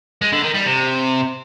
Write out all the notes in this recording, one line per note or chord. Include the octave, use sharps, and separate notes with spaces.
G#3
D3
D#3
G3
C3